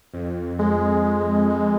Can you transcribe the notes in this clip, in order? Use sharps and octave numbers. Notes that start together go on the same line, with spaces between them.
F2
G#3
G#3
G#3